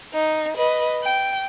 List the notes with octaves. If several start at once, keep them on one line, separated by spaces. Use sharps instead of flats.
D#4
B4 D#5
G5